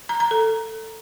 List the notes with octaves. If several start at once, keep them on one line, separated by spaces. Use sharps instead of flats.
A#5
A#5
A4